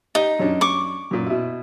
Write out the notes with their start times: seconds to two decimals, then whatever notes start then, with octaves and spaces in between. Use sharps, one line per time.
0.15 D#4 G4 D#5
0.39 F#2 C#4 D4
0.61 C#6 D6
1.11 F#2 A#2
1.26 B2 E4